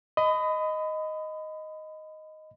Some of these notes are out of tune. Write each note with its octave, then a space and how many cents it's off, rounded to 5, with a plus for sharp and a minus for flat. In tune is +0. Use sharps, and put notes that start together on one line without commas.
D#5 +0 B5 +30